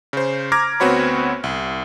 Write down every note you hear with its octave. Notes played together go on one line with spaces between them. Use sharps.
C#3 C5
A#5 D6 F6 G#6 A#6
D2 B3 C4 F#4 C#5 B5
C2